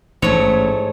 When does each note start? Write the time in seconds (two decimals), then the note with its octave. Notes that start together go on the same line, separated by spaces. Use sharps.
0.22 A1 G#2 A3 C#5